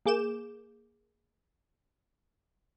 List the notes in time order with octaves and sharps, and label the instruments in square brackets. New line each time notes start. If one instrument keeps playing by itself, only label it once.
[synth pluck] A#3 G#4 D6 G6 E7